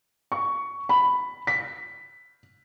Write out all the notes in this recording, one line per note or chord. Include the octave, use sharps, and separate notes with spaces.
C#6
B5
B6